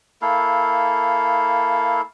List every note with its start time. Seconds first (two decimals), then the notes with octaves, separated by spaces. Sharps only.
0.22 A#3 E4 A4 F5